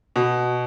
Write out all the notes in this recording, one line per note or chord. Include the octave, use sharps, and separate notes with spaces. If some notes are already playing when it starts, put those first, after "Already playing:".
B2